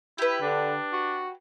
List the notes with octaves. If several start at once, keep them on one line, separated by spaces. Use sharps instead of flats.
E4 G4 B4
D3 D4
F#4